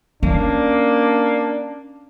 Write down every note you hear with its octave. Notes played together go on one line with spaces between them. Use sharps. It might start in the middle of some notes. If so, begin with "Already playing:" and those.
A#3 C#4 D4